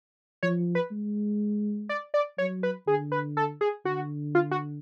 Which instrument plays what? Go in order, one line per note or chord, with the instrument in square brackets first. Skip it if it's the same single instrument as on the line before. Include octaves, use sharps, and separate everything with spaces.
[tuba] F3 [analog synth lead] C#5
[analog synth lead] B4
[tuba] G#3
[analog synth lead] D5
D5
[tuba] F#3 [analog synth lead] C#5
[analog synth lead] B4
[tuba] D3 [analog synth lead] G#4
[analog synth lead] B4
A4
G#4
[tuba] D3 [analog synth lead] F#4
[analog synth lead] F4
F#4